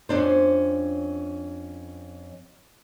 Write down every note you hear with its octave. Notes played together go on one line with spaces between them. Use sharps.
F2 C#4 D4 C5